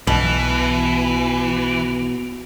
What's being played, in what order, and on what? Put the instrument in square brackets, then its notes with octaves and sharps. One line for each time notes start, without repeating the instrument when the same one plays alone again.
[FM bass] B1 [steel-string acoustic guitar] B2 [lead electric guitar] E3